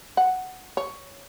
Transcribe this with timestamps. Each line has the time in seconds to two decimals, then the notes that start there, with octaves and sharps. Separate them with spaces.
0.17 F#5
0.77 C#5